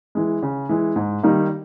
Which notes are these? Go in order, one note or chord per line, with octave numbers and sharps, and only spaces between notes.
E3 G#3
C#3
E3 G#3
G#2
D#3 G3 A#3 D#4